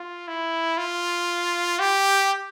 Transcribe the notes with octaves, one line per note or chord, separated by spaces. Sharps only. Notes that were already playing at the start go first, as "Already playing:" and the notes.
Already playing: F4
E4
F4
G4